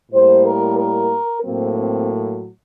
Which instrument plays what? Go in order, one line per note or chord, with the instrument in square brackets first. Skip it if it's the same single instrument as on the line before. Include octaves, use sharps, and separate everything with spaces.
[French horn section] A2 G3 A#3 C5
A#4
A#4
A2 F#3 A#3 C4
C4